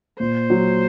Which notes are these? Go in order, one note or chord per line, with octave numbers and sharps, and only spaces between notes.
A#2 C5
F#3